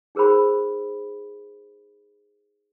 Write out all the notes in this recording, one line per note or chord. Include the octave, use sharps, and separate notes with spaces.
D#4 G#4 A#4 C5 B5